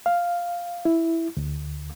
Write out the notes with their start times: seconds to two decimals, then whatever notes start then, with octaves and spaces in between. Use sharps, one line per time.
0.06 F5
0.85 E4
1.37 D2